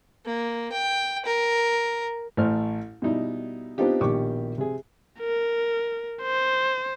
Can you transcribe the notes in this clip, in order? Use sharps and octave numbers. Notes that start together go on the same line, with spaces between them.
A#3
G5
A#4
A1 A3 C5 F6
B2 G3 D#4 E4
B3 C4 D4 D#4 F4 G4
A#1 B2 D#3 G4 C#6 D6
C3 G#4
A#4
C5